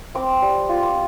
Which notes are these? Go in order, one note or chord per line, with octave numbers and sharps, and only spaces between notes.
C4 D6
G3
F4
D6